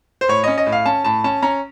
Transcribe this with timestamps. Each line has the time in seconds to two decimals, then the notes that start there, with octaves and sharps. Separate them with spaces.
0.21 C5
0.29 A2 C#5
0.44 C#4 D#5
0.58 D#5
0.66 A2
0.72 F5
0.86 C#4 A5
1.04 A2 A5
1.24 C#4 A5
1.42 C#4 A#5